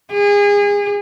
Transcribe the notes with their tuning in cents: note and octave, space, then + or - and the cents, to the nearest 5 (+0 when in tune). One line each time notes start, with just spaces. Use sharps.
G#4 -30